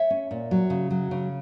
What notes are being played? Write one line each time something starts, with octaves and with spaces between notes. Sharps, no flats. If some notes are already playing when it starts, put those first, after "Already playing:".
Already playing: C#5 E5
C#4
A#2
F#3
C#3
F#3
C#3